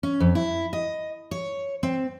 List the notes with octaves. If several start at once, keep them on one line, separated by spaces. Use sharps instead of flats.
C#4
F2
E4
D#5
C#5
C4